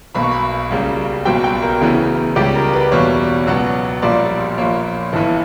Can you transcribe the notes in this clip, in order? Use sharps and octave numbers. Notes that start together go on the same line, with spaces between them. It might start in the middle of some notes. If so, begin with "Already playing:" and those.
B1 B2 A#3 B5
C#6
B5
C#2 C#3 G3 A#3
B1 B2 G3 A#3 G5
G5
A#4
D2 C#3 E3 B3
C#2 C#3 G3 G4
A#4
B4
E2 B2 G3 A#3 C#5
C#2 B2 F#3 B3
A#1 A#2 G3 A#3 D5
A#1 A#2 A#3 C#5
G1 G2 E3